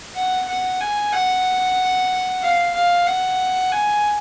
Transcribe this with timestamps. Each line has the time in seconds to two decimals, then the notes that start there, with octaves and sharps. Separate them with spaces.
0.15 F#5
0.48 F#5
0.81 G#5
1.12 F#5
2.43 F5
2.75 F5
3.07 F#5
3.72 G#5